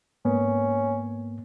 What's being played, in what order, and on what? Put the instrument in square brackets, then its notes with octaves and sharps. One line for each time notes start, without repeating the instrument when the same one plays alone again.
[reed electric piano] G#2 A#3 B3 [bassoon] C#4